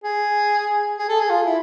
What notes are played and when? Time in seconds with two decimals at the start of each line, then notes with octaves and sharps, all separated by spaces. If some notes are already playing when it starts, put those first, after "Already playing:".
0.04 G#4
0.98 G#4
1.09 A4
1.20 G#4
1.30 F4
1.46 E4